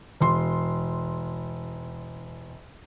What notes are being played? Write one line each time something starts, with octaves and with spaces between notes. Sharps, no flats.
E1 C6